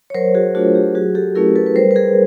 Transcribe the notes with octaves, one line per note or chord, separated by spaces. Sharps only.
C#5
F#3 A#4 C5
F#4 G#4
A3 D4 F4 F#4
G4
F#3 F#4 G#4
G4 A4
A3 C#4 E4 G#4 A#4
A4 B4
B4
G3 A#4 C5
B4
G#4 A#4